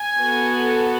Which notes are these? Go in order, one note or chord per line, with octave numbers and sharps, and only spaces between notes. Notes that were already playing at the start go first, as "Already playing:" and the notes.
Already playing: G#5
B3 F#4 A4